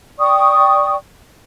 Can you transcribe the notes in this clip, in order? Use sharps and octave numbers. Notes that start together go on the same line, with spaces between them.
D5 G5 C#6 D#6